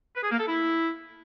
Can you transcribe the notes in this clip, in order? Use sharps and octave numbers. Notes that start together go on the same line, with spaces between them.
B4
G#4
A#3
A4
E4